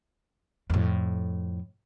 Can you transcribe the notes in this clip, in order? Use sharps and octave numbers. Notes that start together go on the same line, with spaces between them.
F2 A2